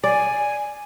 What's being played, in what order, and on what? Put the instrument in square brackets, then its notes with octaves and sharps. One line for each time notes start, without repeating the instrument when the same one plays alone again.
[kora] D5 [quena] G#5